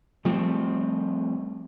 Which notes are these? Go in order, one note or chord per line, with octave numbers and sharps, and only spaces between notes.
F3 G3 A3 C4